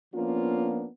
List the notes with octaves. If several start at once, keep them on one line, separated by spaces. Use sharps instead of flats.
F3 A#3 B3 C#4 D4 F4